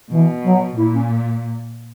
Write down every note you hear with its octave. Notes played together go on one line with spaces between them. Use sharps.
B2 E3
F#3
A#2 E4
C#4